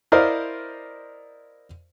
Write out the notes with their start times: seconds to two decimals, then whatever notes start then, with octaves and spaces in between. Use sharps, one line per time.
0.12 E4 A#4 C5 D5 D#5 F5